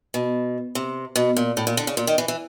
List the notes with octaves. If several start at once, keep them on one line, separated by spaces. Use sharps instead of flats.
B2
C3
B2
A#2
A2
A#2
D3
C#3
A#2
D#3
E3
E3